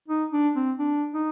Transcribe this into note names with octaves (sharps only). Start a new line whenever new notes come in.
D#4
D4
C4
D4
D#4